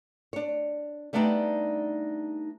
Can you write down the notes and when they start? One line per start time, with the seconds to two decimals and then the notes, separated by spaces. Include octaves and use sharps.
0.33 D4 C#5
1.13 G3 A3 B3 D4 D#4 G4